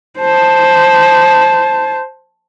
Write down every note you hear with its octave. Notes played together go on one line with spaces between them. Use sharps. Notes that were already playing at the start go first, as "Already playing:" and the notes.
C5 A5